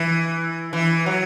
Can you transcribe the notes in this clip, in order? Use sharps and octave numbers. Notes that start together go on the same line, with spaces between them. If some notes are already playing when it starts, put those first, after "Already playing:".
Already playing: E3
E3
F#3